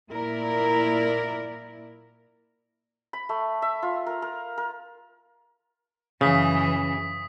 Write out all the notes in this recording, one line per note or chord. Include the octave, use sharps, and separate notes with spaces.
A#2 E4 A#4 D5
B5
A3
E5
F4
A#4
A#4
A#4
F#2 C#3 E3 D#6 B6